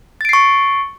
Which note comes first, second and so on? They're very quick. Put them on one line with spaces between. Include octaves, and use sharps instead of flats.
A6 D7 C7 C#6